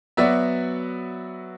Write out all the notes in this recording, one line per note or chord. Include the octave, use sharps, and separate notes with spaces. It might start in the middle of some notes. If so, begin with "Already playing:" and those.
F#3 B3 F#4 D5 E5